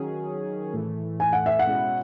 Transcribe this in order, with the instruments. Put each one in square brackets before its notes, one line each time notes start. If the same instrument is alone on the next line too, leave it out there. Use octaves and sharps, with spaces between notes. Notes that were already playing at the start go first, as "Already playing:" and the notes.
Already playing: [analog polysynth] D#3 F#3 C#4 G#4
A2 E3 A3
[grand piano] G#5
F#5
E5
F#5
[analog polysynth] B2 G#3 C#4 E4